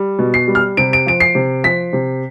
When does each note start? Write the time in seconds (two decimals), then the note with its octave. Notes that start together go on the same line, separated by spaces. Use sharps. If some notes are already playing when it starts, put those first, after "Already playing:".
Already playing: G3
0.19 B2
0.34 C7
0.48 G3
0.55 F6
0.77 C3 D7
0.93 D7
1.06 F3 D7
1.20 C7
1.35 C3
1.64 F3 B6
1.93 C3